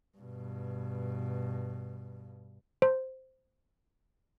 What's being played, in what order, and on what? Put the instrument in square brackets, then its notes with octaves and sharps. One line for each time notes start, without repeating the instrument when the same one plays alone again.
[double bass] G2 B2
[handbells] C5